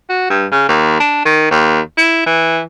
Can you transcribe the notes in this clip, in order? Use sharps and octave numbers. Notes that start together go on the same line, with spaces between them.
F#4
G2
C#3
D#2
D4
D#3
D#2
E4
E3